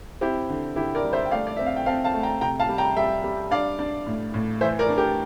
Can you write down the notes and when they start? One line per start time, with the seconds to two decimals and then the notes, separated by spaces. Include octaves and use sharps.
0.21 C4 E4 G4
0.49 D3
0.76 D3 E4 G4
0.95 A#4 D5
1.04 G3
1.13 C5 E5
1.26 G5
1.31 A3 D5 F5
1.47 D5
1.57 C4 E5
1.66 F5
1.77 G5
1.86 C4 F5 A5
2.04 F5 A5
2.14 A3
2.23 G5 A#5
2.41 C3 G5 A#5
2.60 F5 A5
2.69 G3
2.78 G5 A#5
2.96 G3 E5 G5
3.24 G3
3.51 D4 D5 F5
3.79 D4
4.07 A2
4.34 A2
4.61 E3 C5 E5
4.79 A#4 D5
4.89 D4
4.98 G4 A#4